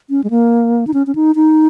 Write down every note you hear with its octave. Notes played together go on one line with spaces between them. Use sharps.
C#4
G#3
A#3
D#4
C#4
C#4
D#4
D#4